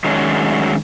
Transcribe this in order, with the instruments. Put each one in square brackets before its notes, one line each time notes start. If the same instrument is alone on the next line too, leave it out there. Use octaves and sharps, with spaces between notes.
[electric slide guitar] D#3 F#3 G#3 A3 C#4 D4